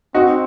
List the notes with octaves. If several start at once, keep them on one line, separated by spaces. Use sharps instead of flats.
C4 D#4 F#4